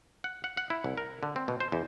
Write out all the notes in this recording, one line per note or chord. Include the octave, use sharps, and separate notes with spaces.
F#5
F#5
F#5
E4
C2
A#4
D3
C4
B2
C5
E2